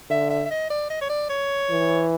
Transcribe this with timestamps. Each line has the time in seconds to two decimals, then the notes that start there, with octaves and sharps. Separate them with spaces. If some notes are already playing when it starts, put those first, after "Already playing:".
0.10 D3 E5
0.30 E5
0.45 E5
0.51 D#5
0.70 D5
0.90 D#5
1.01 C#5
1.09 D5
1.30 C#5
1.70 E3